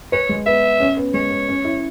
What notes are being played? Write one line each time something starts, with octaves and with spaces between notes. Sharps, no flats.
B4 C#5
G#3
B3 E5
C#4
B3
G#3 C#5
B3
C#4
E4